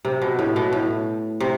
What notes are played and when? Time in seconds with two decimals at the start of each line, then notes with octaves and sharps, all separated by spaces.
0.05 C3
0.22 B2
0.39 A2
0.56 B2
0.73 A2
1.40 C3